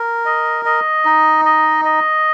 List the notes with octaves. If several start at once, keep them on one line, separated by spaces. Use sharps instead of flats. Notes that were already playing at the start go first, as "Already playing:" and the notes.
Already playing: A#4
D#5
D#5
D#4
D#5
D#5